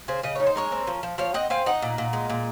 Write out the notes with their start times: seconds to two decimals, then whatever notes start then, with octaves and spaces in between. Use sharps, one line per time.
0.08 C#3 G#4 C5
0.23 C#3 D#5
0.35 D#4 C#5
0.47 C5
0.56 G#3 A#4 C#5
0.72 C4
0.87 F3
1.03 F3
1.18 F3 C#5 F5
1.34 C4 D#5 F#5
1.50 C4 F5 G#5
1.66 D#4 D#5 F#5
1.82 A#2
1.98 A#2
2.13 G#3
2.30 A#2